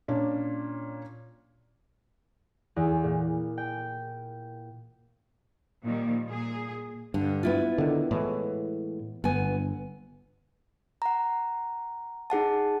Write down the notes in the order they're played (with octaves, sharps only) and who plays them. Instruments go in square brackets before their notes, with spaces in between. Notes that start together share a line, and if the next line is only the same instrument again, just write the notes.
[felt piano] A#2 C#4 D4
[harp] E2
A#2
G5
[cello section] A#2 D#3 F3 G3 A#3
A#2 G#4
[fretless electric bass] G2 [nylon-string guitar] D3
[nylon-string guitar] B3 E4 F4
[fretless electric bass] D3 D#3
A2 E3 G#3
[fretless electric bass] G1 [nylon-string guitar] B3 G#5
[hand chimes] F#5 A#5
D#4 G#4 F#5 A5